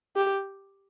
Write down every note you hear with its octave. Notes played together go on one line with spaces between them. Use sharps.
G4